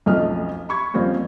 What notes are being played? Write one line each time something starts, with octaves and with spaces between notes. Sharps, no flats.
B1 F2 A3 C#4 D#5 F6
B5 C#6 G#6
F2 G3 A#3 C4 C#4